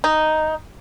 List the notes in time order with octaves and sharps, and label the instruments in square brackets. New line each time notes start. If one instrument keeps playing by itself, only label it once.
[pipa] D#4